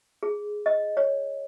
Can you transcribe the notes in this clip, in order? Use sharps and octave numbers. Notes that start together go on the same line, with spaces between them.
G#4
D#5
C#5